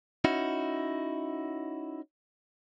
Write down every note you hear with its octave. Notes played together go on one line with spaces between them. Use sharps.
C#4 D#4 E4 F#4